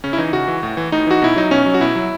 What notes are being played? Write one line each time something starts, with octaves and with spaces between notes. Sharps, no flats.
C#3 C#4
E4
E3 D#4
C#3 F#4
E3
A2
E3
A2 D#4
E3 F#4
B2 E4
F#3 D#4
B2 C#4
F#3
F#4
B2 E4
F#3